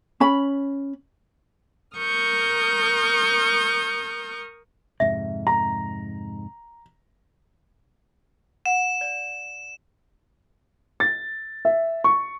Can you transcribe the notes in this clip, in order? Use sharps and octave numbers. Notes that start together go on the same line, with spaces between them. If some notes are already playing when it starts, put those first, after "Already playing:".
C#4 B5
A#4 C#6 D#6 F6 G6
F2 G#2 C3 E5
A#5
F#5 E7
D5
A6
E5
C#6